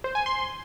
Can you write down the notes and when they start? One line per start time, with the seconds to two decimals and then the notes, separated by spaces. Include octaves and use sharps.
0.04 C5
0.15 G#5
0.26 C6